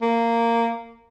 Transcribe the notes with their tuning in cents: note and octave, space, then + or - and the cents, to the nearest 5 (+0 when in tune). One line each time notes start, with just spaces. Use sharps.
A#3 -10